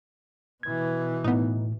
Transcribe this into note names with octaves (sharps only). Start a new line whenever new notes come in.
B2 E3 G#6
A2 B3 D#4